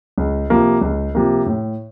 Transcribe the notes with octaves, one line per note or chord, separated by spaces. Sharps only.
C#2
C3 F3 A#3
C#2
C3 F3 A#3
A2